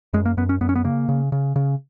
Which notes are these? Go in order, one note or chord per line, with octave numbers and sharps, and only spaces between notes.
F#2 G#3
A#3
F#2 B3
C#4
F#2 B3
C#4
B3
C#3 A#3
C#3
C#3
C#3